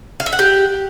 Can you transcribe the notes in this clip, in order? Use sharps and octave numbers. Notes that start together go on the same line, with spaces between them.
F5
E5
F#5
G4